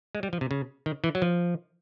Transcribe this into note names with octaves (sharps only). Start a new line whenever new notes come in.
G#3
G3
F3
C3
C#3
D#3
E3
F#3
F3